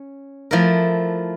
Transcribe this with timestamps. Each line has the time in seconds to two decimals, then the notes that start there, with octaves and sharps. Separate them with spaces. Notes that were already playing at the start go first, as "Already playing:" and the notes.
Already playing: C#4
0.51 F3 A3 E4 A#4